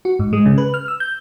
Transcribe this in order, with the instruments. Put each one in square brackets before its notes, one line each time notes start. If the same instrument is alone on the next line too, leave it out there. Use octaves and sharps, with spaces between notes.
[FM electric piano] F#4
G#2
G#3
C#3
B4
F6
E6
G6